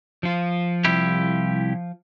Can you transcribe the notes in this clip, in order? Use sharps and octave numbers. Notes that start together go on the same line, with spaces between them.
F3 F4
C2 E4 G4